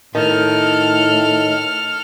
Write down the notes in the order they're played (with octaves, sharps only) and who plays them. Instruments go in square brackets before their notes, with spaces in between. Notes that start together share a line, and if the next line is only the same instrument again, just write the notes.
[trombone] A2 [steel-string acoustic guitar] D#3 [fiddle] A4 F6